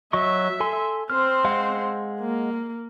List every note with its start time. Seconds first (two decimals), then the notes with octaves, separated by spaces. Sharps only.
0.13 F#3 D#5 E5 C#6
0.60 A4 G#5 C6
1.10 C4 C5 F6
1.44 G#3 F5 F#5
2.20 A#3